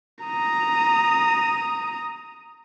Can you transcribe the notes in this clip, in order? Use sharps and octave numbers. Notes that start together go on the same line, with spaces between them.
A#5 D#6